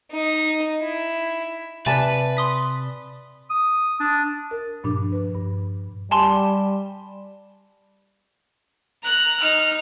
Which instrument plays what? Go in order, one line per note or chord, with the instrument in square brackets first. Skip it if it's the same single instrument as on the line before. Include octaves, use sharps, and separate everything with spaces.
[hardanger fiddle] D#4
E4
[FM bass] C3 [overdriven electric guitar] B4 [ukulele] D5 E5 A5 [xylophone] G#5
[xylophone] C6 D#6 B6
[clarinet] D#6
D4
[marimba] A#4
G2 A#2 F3 D4 D6
B4
G2
[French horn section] G3 [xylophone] G#5 A5 C6
[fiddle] A#5 F#6
D#4 F6